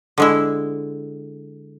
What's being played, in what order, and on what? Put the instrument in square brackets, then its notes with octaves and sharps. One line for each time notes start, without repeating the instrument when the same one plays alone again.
[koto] D3 G#3 E4